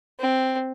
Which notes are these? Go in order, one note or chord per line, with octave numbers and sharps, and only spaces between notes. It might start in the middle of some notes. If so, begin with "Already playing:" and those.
C4